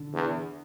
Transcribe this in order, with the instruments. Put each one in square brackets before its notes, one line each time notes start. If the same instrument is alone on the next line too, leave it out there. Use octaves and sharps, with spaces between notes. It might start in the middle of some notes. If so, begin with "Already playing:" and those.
Already playing: [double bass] D3
[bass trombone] E2